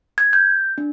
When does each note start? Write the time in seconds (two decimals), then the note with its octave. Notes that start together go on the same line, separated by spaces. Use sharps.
0.18 G#6
0.33 G6
0.78 D4